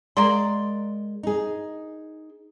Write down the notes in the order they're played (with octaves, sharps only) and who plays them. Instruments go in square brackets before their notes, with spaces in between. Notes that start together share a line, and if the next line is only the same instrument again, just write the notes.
[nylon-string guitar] G#3 [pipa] A#3 D5 C6
[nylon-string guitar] D#4 G#4